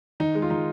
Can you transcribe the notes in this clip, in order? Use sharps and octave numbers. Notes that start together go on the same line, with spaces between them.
D#3 D#4
G#3
F4
D#3 D#4